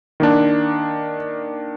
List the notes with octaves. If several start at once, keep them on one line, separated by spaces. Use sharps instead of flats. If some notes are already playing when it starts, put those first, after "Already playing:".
D#3 A#3 D4